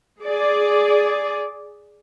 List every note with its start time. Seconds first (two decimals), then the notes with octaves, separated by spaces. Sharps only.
0.23 G#4 D5